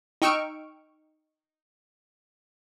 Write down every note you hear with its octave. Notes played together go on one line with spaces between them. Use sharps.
D#4 G5 C#6 E6 F6 D7